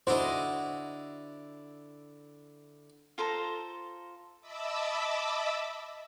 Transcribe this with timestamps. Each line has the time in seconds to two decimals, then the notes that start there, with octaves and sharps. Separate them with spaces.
0.07 D3 D4 E4 F#4 C5 D#5
3.18 F4 A4 C5 A#5
4.41 D#5 E5 A5 B5 D6 E6